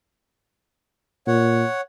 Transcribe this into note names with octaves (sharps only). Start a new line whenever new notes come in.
A#2 C#5 F#5